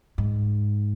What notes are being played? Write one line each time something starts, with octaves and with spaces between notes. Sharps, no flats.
G#2